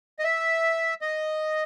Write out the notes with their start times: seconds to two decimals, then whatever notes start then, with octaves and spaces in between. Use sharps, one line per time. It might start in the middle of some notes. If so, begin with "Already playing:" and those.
0.19 D#5
0.24 E5
1.01 D#5